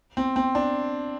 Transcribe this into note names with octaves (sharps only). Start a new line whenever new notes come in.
C4
C4
D4